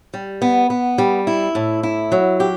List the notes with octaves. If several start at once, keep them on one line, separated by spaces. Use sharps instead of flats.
G3
B3
B3
G3
E4
A2
E4
F#3
G4